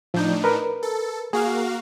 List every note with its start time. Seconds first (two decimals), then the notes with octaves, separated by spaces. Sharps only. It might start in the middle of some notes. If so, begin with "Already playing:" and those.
0.14 A2 F3 D4 D#4 G6
0.44 A#4 B4
0.83 A4
1.33 A#3 F#4 G#4 F5